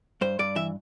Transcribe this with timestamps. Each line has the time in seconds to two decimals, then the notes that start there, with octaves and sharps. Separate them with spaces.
0.21 G2 C5
0.39 G2 D5
0.56 E3 E5